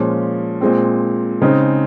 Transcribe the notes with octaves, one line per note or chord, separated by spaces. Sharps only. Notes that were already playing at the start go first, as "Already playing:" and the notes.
Already playing: A#2 F3 G#3 C#4 F4
A#2 G#3 C4
C#3 G#3 C4 D#4 G#4